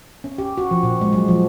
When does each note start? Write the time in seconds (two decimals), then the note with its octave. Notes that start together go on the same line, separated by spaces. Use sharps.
0.24 C#4
0.38 G4
0.58 F#4
0.71 F3
0.83 A#2
1.01 G#3
1.13 F#3
1.28 F3